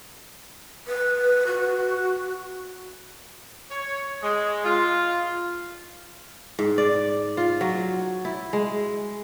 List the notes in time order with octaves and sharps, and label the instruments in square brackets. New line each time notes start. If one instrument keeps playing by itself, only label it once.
[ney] B4
F#4
[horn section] C#5
G#3
F4
[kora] G#2
D5
F4
F#3
E4
G#3